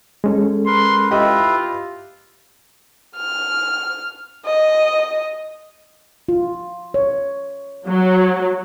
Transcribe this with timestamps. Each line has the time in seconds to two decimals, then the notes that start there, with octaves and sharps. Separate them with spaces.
0.24 G#3 C#4 A4
0.67 A#4 B4 C6
1.11 E4 F4 G4 B4 D#5
3.16 F6
4.46 D#5
6.29 F4
6.94 C#5
7.87 F#3